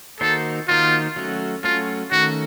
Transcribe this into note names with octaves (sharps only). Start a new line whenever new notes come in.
D#3 A#3 D#4 F#4 A4 C5
D#3 A#3 D#4 F4 F#4 C5
F#3 A3 C#4 F#4
F#3 A3 C#4 F4 F#4
D#3 A3 C#4 F#4